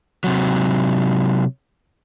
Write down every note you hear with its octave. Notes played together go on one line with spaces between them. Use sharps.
C3 F#3